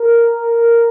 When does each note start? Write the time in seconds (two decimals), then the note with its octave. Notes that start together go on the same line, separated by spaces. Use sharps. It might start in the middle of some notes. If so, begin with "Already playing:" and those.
Already playing: A#4
0.55 A#4